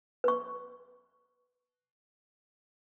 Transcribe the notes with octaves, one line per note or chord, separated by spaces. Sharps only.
B4 C#6